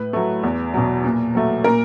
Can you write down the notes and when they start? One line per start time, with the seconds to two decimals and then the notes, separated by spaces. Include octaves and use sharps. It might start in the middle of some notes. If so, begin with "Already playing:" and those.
Already playing: A2 B4
0.13 F#3 A3
0.43 E2
0.74 B2 F#3
1.04 A#2
1.35 F#3 A3
1.64 A#2 A#4